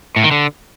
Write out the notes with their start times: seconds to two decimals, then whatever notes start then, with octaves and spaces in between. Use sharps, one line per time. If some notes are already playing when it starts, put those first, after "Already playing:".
0.16 A2
0.24 D#3
0.31 D3